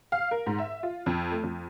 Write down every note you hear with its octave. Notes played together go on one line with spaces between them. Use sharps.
F5
A#4
G#2
E5
F4
F2
A3
F2